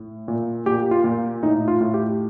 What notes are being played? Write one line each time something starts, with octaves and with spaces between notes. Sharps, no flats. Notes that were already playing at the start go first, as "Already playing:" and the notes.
Already playing: A2
A#2
A#2 G4
F4
A#2
A2 D#4
F4
A2
G4